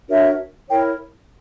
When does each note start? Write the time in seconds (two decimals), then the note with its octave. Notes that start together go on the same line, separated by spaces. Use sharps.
0.09 D4 F#4 A#4 C#5 E5
0.70 E4 A#4 C#5 G5